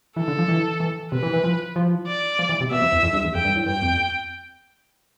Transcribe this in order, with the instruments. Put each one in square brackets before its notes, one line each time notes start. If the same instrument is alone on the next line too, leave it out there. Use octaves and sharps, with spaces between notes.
[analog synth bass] E3 [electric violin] A4
[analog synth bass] D3
F3
E3
E3
[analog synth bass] C3 [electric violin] B4
[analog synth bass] E3
E3
F3
F3
[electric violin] D5
[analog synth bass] F3
E3
C3
[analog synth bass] B2 [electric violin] E5
[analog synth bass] F2
E2
F2
G2
E2
[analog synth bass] F2 [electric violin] G5
[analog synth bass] G2
A2
[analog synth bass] G2 [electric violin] G5
[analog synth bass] F2